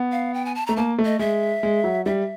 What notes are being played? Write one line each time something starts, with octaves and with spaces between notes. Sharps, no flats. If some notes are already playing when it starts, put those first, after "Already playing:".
Already playing: B3
F5
G5
G#5
A5
A3 A#5
A#3 A5
A3
D#5
G#3 E5
G#3
F#3
G3 E5